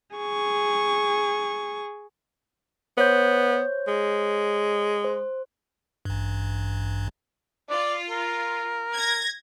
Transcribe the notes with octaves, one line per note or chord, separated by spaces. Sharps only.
G#4 C#6
B3 C5 C#5 G6
G#3
C5
A1 G2
F4 D5
A#4
G#6 A#6